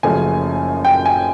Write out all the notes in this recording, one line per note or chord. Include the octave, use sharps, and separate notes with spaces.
F#1 F#2 C#3 F3 A3 G#5
G5
G#5